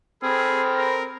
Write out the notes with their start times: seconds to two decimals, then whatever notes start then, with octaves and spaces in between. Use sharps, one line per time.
0.23 C4 G#4 A4 B5 F6
0.76 A#4